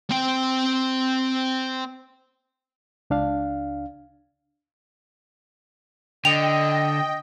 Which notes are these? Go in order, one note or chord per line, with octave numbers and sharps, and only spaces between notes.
C4 G5
C#2 D4 F5
D3 D#5 G5 F7